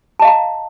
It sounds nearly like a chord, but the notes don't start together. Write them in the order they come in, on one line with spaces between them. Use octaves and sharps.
A5 D#5 F5 A#5